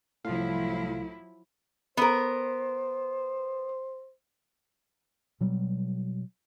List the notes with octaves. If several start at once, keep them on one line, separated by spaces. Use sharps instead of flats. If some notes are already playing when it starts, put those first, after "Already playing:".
C2 A2 F3 F#3 E4 F4 F5
B3 A#4 C5
B2 F#3 G3